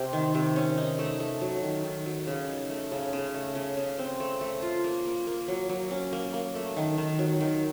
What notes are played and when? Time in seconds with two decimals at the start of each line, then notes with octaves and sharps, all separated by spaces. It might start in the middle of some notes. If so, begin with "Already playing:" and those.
Already playing: C3 C4
0.13 D#3
0.35 C3
0.56 C#4
0.78 D#4
0.99 A3
1.20 A3
1.41 F#3
1.63 D#3
1.84 D#3
2.06 F#3
2.27 C#3
2.48 D#4
2.69 A3
2.91 C#3
3.13 C#3
3.34 A3
3.55 C#3
3.77 C#3
3.98 C4
4.20 A3
4.41 A3
4.62 F4
4.84 A#3
5.05 A#3
5.27 A#3
5.48 F#3
5.69 F#3
5.91 C#4
6.13 A#3
6.34 A#3
6.55 A3
6.77 D#3
6.98 D#3
7.19 F#3
7.41 D#3